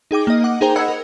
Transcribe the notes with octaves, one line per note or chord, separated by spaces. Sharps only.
D#4 G#4 G5 D6
A#3 D#5
F#5 D6
D#4 G#4 A#4 C5 G5 A#5
D#5 F#5 B5 E6 G#6 C#7
A#4